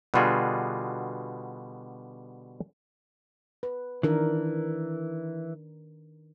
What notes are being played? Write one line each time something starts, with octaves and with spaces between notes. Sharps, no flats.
B2 D3 G3 F4 F#4 G#4
B4
D#3 E3 D4 A#4